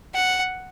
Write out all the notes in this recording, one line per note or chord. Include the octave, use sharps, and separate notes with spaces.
F#5